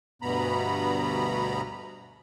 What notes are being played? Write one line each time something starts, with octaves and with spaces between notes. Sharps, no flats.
D2 G2 B2 B3 A#5 B5